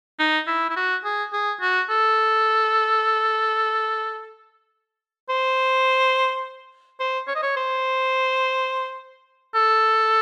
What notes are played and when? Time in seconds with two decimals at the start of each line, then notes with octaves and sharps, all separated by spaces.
0.19 D#4
0.47 E4
0.69 E4
0.76 F#4
1.04 G#4
1.33 G#4
1.61 F#4
1.89 A4
5.29 C5
7.00 C5
7.28 C#5
7.35 D#5
7.43 C#5
7.56 C5
9.54 A4